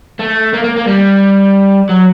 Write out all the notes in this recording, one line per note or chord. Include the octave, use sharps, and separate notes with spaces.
A3
A#3
A#3
A#3
G3
F#3